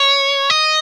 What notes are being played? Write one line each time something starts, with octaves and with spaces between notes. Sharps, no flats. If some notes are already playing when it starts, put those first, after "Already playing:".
Already playing: C#5
D#5